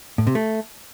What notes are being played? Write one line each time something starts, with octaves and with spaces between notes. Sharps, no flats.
A2
C3
A3